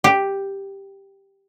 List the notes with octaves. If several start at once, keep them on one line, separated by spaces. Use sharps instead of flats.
G4